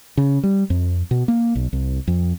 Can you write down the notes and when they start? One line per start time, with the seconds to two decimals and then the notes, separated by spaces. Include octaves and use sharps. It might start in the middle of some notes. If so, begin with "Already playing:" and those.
0.17 C#3
0.43 G3
0.70 F2
1.11 B2
1.28 A#3
1.55 B1
1.73 C2
2.08 F2